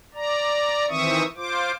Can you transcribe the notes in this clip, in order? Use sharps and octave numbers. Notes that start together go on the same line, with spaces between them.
D5 A#5
D#3 E3 C4 E5 C#6 D#6
F4 C5 D6